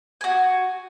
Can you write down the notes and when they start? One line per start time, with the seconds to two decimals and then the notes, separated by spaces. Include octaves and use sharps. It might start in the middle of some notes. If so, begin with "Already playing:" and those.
0.21 F#4 G#5